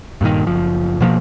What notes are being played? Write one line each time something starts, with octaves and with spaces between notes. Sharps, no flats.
G2 A#2 D3 D#3
F#1 F3
B2 F3 G#3 A#3